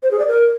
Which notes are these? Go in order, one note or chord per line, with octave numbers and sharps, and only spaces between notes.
C5
G#4
D5
A#4